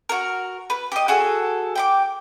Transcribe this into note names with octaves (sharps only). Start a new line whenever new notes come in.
F#4 A#4
B4
G4 D#5
F#4 G#4 A4
G5 B5 D6